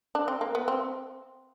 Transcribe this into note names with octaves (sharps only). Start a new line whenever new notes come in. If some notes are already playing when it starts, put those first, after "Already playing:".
D4
C4
A#3
B3
C4